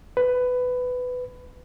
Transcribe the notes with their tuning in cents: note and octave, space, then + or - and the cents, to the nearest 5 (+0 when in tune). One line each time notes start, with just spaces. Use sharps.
B4 +15